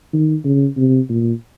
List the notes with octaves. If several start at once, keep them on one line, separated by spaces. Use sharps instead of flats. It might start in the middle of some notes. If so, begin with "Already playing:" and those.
D#3
C#3
C3
A#2